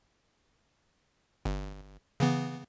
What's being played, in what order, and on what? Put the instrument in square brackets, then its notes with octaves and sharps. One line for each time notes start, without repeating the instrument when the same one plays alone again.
[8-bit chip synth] G1
C#3 E3 B3